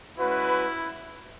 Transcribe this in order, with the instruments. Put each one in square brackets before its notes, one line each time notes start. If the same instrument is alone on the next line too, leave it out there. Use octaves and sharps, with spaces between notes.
[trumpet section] G#3 C#4 F#4 B4 [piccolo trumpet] E4